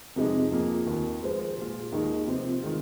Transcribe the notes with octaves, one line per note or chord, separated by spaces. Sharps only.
F2 C3 F3 G#3 D#4
F2 F3 A#3 G#4
D#2 D#3 A#3
F3 G#3 F4 C5
A#2 G#3 F4
D#2 D#3 G#3 D#4 G#4
C3 F3 C4
D#3 G#3 F4